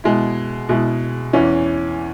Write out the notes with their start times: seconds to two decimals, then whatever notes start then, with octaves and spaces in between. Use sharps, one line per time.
0.04 B2 G#3 E4
0.69 B2 G#3 E4
1.33 E2 E3 C#4